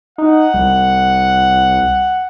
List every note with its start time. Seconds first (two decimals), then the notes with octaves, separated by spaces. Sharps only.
0.18 D#4 F#5
0.54 C2